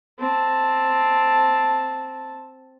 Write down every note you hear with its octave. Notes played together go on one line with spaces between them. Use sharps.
C4 A5